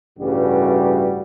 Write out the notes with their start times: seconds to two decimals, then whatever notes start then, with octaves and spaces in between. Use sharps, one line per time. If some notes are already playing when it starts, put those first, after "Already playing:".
0.19 A1 G2 C#3 E3 G3 F#4